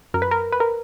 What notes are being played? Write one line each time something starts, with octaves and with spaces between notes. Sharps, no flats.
F#2 A#4
B4
A#4
B4
A#4